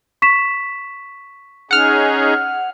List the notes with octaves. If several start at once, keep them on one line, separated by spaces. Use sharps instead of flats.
C#6 B6 E7
C#4 D#4 G#4 F#5 F6